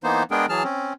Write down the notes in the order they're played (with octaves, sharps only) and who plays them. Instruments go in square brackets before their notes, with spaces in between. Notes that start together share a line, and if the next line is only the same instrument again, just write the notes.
[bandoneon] E3 A#3 B3 D#4 C5
G#3 B3 D4 G#4 A#4 G5
E3 F#3 G#4 A5 F6
C4 C#4